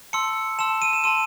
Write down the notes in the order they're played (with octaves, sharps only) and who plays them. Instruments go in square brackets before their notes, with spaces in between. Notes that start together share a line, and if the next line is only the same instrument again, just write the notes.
[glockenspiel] A5 C6 E6 C#7
A5 C6 E6 E7
D#7
E7
A5 C6 E6 D#7